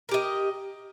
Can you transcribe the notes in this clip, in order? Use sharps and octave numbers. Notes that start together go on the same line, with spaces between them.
G4 A#4 D#5